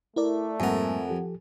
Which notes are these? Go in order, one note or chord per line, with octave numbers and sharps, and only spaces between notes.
A3 E4 A#4 D5
F2 G#2 G3 A#3 A#4 F#5 G#5
F3 G4 A4